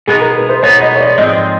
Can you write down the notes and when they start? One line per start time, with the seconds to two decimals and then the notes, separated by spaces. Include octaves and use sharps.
0.07 B2 G#3 B3 D#4 G#4
0.21 A#4
0.36 B4
0.49 C5
0.63 B2 G#3 B3 D#4 C#5
0.81 D#5
0.96 C#5
1.00 D5
1.18 G#2 F3 G#3 C4 D#5